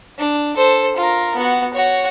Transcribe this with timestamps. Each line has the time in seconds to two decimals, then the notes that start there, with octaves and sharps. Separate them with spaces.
0.18 D4
0.57 A4 C5
0.96 F4 A#4
1.35 B3 F#4
1.74 F#4 C#5